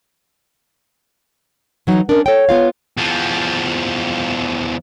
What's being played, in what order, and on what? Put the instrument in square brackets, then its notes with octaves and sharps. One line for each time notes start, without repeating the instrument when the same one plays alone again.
[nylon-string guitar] E3 F#3 D#4
[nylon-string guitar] C#4 D4 [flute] A#4
[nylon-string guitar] A4 G5 [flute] C#5
[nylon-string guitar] B3 F4 F5
[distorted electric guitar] E2 F3